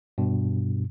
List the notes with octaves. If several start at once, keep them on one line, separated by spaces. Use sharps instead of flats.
G2 B2